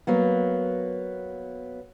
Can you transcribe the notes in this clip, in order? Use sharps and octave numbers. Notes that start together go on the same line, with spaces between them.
F#3 A#3 B3